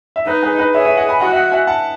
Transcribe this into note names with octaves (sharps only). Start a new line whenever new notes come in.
E5
D#4 B4 D#5
G#4 B4
B4 D#5
G#4 C#5 E5
C#5 E5
D#5 F#5
G#5 B5
F#4 D#5 F#5
E5
D#5 F#5
E5 G#5
F#5 A5